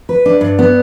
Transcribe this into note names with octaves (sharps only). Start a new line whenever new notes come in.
B4
D4
G2
B3